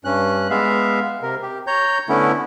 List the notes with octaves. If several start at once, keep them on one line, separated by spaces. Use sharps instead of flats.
G2 C#4 F#6
G#3 B3 E5 F5
C3 A#4
G4
C#5 A#5 G6
D3 A3 B3 C#4 E4